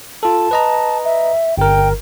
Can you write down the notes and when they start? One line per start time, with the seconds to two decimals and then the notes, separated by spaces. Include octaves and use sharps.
0.23 F4 A4 A5
0.51 B4 D#5 A#5
1.05 E5
1.57 G1 A#4 G5